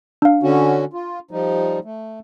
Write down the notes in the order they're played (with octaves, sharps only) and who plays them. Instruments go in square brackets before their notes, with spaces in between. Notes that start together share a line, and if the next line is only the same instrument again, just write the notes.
[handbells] D4 F5
[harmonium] D3 C#4 F#4
F4
F3 G3 D#4
A3